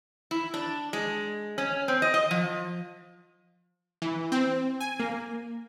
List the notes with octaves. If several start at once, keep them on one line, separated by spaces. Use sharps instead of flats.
E4
D4
G#3
C#4
C4
D#5
D#5
F3
E3
C4
G#5
A#3